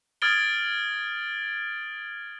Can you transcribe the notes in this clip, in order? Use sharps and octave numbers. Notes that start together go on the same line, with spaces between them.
D#6 F6 G#6 A6 D7 G7